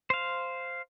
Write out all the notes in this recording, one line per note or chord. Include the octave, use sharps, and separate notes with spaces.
C5 F5